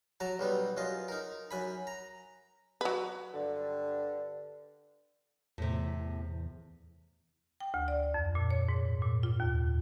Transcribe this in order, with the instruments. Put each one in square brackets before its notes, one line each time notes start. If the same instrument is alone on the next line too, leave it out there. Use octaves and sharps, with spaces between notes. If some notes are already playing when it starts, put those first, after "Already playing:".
[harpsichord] F#3 A5 A#5
B1 G3 B3
F#2 F4 D#5
D#4 A#4
F#2 G#5 B5
A#5
[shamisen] F#3 B4
[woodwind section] G2 D3
[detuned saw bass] E2 [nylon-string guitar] A2 C3
[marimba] G5
D2
D5
F2
A#2
C#5
G#2
A#2
F4
D#2